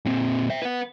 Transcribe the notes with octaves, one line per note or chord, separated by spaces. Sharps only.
A#2 C4
C5 E5
B4 F#5